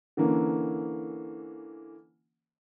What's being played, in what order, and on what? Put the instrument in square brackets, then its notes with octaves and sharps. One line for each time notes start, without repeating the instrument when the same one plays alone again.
[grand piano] D3 E3 A#3 C#4